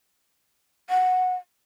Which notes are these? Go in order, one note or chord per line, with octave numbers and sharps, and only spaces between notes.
F#5